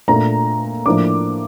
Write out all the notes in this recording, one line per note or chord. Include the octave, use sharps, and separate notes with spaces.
A#2 A3 D4 A#5
A2 F3 A#3 D4 D6